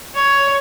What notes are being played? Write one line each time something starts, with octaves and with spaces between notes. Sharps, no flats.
C#5